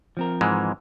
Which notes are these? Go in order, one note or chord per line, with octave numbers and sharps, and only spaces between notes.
F3 C4 A#4
G#2 E3 G#3